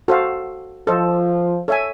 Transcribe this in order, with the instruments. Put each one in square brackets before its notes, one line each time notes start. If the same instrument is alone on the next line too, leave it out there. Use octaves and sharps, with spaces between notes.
[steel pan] F#4 A4 C5 F5
[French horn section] F3 [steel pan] A4 C5 D#5
[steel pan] A4 C#5 E5 G#5